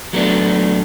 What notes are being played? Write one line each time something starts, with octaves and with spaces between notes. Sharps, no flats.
F#3 A3 B3 D4